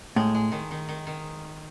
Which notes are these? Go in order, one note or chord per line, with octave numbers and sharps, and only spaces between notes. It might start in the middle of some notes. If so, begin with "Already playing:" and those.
A2 G#3
G#3
D#3
D#3
D#3
D#3